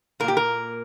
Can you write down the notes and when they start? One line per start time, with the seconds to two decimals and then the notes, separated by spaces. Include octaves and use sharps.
0.20 A#2 A#4
0.24 A#3 G4
0.37 A#4